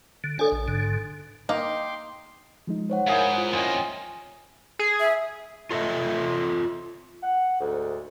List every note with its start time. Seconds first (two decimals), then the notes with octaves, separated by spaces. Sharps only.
0.24 D3
0.39 D4 A4 C#5 D5
0.52 A1
0.68 G#2 D3
1.49 A#3 D#4 G5 A#5 C6 D6
2.67 F3 G#3 D#4
2.90 C5 C#5 F#5
3.07 G#2 E4 G#4 A#4 F5
3.33 F4 C5 F#6
3.53 F2 A#3 C#4 D#5 F#5 C6
4.79 G#4
5.00 E5
5.71 F4 A4 D#5 E5
7.23 F#5
7.60 D2 G#2